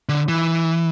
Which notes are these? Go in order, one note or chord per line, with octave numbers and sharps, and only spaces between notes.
D3
E3